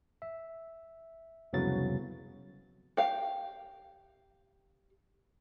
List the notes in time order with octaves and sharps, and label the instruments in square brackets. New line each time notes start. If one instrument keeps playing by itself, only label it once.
[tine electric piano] E5
C2 F2 C#3 F#3 B3 A6
[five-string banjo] G4 F5